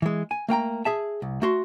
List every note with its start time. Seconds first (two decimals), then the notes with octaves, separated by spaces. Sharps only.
0.02 E3 G#3
0.31 G#5
0.49 A3 A#3 G5 A#5
0.85 G#4 E5 A5
1.22 C2
1.42 A3 F#4 C6